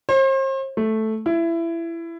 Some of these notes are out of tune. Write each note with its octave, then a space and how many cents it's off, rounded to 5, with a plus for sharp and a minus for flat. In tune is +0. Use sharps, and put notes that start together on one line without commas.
C5 +40
A3 -5
E4 +20